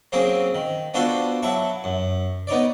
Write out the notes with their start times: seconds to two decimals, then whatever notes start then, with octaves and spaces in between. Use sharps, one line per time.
0.12 F#3 A#3 C4 C#4 G#4
0.55 D#3
0.94 B3 D4 F4 F#4 A4 C5
1.43 F#3 E4 A5 C#6
1.84 F#2
2.47 B3 D#4 C#5 D5